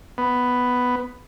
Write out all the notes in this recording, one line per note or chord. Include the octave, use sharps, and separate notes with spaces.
B3